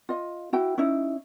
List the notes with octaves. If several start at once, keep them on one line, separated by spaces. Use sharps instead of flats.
F4 D#5
E4 F#4 G5
C#4 D#4 E4